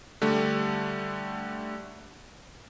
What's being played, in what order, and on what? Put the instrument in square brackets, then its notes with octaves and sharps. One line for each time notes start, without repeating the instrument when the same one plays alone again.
[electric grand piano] D3 G3 A3